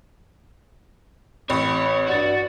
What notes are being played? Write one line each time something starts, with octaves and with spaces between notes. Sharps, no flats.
A1 C4 C#5 B5
G2 F#4 D5